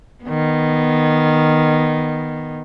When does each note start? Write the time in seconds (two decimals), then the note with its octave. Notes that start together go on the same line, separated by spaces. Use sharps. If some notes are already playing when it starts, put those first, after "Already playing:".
0.24 D#3 B3